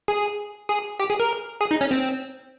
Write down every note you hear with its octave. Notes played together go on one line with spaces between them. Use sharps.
G#4
G#4
G4
G#4
A#4
G#4
D#4
C#4
C4